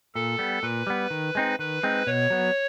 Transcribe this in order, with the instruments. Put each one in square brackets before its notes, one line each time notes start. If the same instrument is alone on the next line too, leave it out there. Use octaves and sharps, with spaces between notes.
[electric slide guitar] A#2 [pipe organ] A4
[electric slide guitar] G3 B3
[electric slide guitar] A#2 [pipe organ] B4
[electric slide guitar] G3 B3
D#3
G#3 C4 D#4
[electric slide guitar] D#3 [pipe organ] B4
[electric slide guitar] G#3 C4 D#4
[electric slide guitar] B2 [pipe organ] C#5
[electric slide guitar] F#3 B3